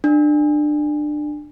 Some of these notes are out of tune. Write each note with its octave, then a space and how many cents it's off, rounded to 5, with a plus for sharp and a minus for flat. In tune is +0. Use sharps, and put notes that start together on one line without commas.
D4 +25